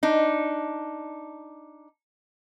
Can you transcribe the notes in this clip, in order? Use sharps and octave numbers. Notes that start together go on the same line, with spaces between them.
D4 D#4